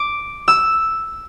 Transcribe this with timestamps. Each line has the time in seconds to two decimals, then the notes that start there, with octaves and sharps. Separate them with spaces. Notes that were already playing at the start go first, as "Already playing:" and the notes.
Already playing: D6
0.48 E6